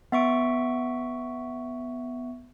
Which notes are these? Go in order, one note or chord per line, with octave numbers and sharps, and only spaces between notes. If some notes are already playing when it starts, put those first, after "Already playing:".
B3 E5 C#6 D7